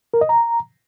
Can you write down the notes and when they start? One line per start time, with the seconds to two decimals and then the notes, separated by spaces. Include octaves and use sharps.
0.14 A#4
0.21 D#5
0.29 A#5